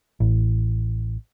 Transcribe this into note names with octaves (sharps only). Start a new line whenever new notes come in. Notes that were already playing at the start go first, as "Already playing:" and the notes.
A1